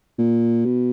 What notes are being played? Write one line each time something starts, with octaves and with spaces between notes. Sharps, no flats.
A#2
B2